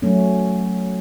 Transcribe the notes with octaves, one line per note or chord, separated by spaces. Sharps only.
F#3 A3 C#4